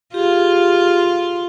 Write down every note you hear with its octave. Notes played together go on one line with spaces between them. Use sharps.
F4 G4 G#4